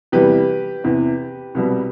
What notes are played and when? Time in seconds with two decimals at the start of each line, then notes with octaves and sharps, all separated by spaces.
0.12 E2 C3 E3 G3 G4 B4
0.84 E2 C3 E3
1.55 C2 B2 G3